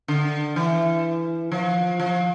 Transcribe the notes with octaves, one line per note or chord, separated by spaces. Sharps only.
D3
E3
F3
F3